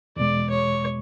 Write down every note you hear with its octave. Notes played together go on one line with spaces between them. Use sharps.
E2 B2 G#3 D5
C#5